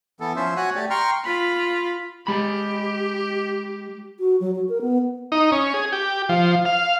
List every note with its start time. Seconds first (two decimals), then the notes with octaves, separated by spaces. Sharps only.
0.20 E3 B3 A4
0.36 F3 C#4 C5 E5
0.57 F#4 C#5 F#5 G#5 F#6
0.75 A3 G4 D5
0.90 G5 A#5 C6 C#6 F6
1.25 F4 B5
2.27 G#3 G4 B5
4.20 F#4
4.40 F#3
4.55 F#4
4.69 A#4
4.82 B3
5.32 D#4
5.52 C#4
5.74 G#4
5.92 G4
6.29 F3
6.65 F5